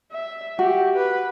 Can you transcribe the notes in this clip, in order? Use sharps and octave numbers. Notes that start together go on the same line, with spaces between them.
E5
F#4 G4
B4